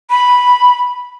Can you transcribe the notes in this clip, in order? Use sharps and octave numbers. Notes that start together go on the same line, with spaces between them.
B5